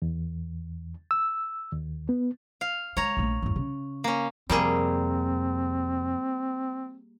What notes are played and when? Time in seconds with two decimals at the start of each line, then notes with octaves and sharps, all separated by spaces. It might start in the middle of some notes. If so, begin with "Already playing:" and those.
0.02 E2
1.11 E6
1.72 D#2
2.09 B3
2.61 F5
2.97 G#3 C#5 A#5
3.17 A#1 A3
3.42 E2 G2
3.56 C#3
4.04 A#3 C#4
4.50 F2 C3 G3 A#3 C4 G#4